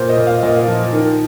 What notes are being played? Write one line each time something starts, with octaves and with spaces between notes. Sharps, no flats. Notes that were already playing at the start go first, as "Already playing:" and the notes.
Already playing: A#2 C5
D#5
A#2
F5
A#2 D#5
F3
D#3